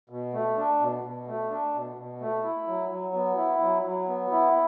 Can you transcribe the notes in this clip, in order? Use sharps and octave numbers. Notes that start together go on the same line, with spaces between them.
B2
A3
D4
B2
B2
A3
D4
B2
B2
A3
E4
F#3
F#3
B3
E4
F#3
F#3
B3
E4